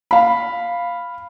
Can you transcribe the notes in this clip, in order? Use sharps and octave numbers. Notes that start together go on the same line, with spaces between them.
F5 B5